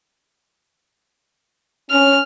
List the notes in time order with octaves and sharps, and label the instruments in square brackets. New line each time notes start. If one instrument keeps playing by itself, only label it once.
[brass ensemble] C#4 [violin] F6